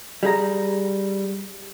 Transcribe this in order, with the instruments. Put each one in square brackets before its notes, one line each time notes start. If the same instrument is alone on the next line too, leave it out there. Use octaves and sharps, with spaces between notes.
[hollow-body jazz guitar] G3 G#4 A#5